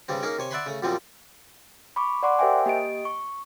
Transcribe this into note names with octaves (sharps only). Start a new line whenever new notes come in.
G2 C#3 G3 C4
A#3 C#4 D#4 G#4 A#4
C3 C#5 G#5
D5 E5 F#5 G#5 B5 C6
C#3 A3
F#2 A#2 F3 G3 C4
B5 C#6 D6
D5 F#5 C6 D6
G4 A#4 C5 E5 G5 G#5
A#3 G4 D#5 D7
C#6